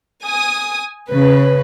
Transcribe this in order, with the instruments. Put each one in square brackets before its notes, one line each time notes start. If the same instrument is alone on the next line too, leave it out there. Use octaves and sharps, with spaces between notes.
[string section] G#5 D#6
C#3 B4